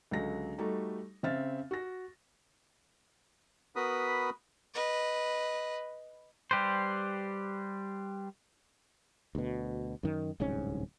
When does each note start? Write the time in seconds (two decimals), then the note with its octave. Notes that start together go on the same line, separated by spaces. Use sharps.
0.11 C#2 D3 F#3 A#6
0.58 G3 A3 D#4 F#4
1.23 C#3 C4 E5 F6 A6
1.71 F#4 A#6
3.76 B3 F#4 A#4 B4 B5 D#6
4.74 B4 D#5
6.51 G3 G4 B4 C5
9.35 D2 B2
10.03 F#2 D#3
10.40 D1 C2 G#2 C#4